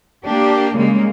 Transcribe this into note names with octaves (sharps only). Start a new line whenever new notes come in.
A#3 D4 G4
C#3 G3 G#3 A#3